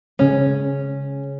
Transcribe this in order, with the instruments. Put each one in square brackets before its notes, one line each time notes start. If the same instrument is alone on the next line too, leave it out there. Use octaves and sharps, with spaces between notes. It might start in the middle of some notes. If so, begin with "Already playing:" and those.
[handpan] C#3 G#3 [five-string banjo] C#4